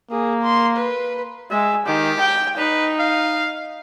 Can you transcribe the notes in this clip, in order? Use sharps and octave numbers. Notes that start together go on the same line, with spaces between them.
A#3 G#4
C6
B4
G#3 E5
D#3 G4
G5
D#4 B4
F5